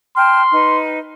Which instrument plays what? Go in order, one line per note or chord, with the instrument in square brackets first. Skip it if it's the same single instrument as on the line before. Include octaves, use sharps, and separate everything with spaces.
[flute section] G5 A5 F6 [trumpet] C6
[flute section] D#4 B4